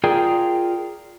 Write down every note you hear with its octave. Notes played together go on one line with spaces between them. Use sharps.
F4 G#4 A#4 D5 G5